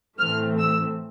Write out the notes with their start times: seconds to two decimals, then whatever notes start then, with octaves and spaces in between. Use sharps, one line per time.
0.18 A2 E3 A3 C4 F6
0.59 E6